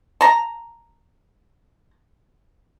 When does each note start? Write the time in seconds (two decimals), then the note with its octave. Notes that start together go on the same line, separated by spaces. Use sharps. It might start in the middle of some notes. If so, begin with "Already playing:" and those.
0.21 A5 A#5